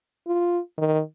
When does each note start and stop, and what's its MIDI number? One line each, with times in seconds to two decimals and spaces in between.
0.27 0.59 65
0.78 1.00 51